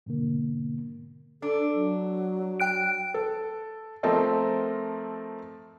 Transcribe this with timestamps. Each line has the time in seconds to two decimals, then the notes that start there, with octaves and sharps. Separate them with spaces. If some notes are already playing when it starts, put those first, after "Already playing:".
0.06 G#2 B2 D3 A#3
1.42 D4 A4
1.74 F#3
2.60 G5 F#6 D7
3.14 A4
4.03 F3 A3 C4 A4 A#4 D#5